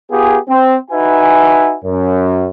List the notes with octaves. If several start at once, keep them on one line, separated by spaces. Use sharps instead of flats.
B3 F4 G4 G#4
C4
D#4 F#4 B4 E5 G#5
F#2